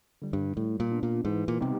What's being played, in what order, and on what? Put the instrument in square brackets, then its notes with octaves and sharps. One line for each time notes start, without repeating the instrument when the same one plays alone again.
[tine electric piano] D3 G3
[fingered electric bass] G2
[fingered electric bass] A2 [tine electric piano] G3
[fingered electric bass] A#2
[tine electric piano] B3 D4 F4
[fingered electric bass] A#2
[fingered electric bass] G#2 [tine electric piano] E3
[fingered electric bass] A#2
[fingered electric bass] C3 [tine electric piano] G3 B3 D#4 G4